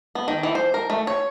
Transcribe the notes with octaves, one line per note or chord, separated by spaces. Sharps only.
B3
D#3
E3
C5
A#4
A3
C#5